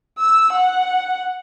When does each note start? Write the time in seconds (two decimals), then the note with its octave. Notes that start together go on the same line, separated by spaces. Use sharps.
0.18 E6
0.52 F#5